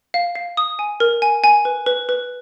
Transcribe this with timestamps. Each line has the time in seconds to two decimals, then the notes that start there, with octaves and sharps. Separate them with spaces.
0.14 F5
0.35 F5
0.57 D#6
0.79 G#5
1.00 A#4
1.22 G#5
1.44 G#5
1.65 B4
1.86 B4
2.09 B4